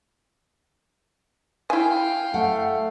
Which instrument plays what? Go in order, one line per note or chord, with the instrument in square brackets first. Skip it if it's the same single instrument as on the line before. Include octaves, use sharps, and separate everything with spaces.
[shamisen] E4 G#5 [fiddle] F5 G5
[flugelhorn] A3 [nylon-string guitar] F#5